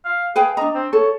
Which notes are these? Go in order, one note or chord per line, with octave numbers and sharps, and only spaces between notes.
F5
G#4 B4 F5 G5
D4 D#5 A#5
C4
A4 C#5